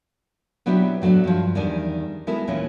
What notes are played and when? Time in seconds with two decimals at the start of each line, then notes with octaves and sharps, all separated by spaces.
0.66 B2 F#3 B3 D4 E4 G4
1.02 A2 F#3 A3 B3 D4
1.24 G2 F3
1.55 E2 D#3 G3 D4 G#5
2.27 G#3 B3 E4 A4 A#4
2.47 D#2 A#2 E3 C#4